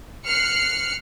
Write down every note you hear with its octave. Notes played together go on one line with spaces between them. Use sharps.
F6 F#6 C7 C#7